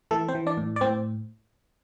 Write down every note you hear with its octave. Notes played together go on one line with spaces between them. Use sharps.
E3 A3 A4
C4 C5
E3
D4 D5
A2
D5
A2 C4 C5